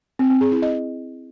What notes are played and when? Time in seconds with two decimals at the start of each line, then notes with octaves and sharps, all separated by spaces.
0.19 C4
0.30 C4
0.41 G#4
0.52 E4
0.62 D#5